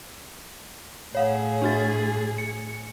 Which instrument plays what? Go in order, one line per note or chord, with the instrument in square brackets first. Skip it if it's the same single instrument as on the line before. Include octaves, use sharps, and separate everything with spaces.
[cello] A2 G#4 [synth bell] C#5 F5 F#5
[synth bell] D4 F#4 A6
C#7